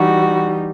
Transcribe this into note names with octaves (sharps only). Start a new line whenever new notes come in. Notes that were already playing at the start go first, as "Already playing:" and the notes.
Already playing: E3 G3 D#4 F#4